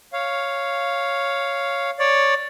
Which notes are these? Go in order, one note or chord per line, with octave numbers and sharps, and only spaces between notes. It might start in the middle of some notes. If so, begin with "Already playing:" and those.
C#5 F5
C#5 D5